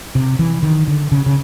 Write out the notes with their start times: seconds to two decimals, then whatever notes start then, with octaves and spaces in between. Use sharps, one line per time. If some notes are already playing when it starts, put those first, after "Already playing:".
0.15 C3
0.39 E3
0.63 D#3
0.88 D3
1.12 C#3
1.26 C#3